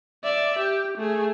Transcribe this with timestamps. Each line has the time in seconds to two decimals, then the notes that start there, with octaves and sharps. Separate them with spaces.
0.24 D5 E5
0.59 G4
0.98 A3 G#4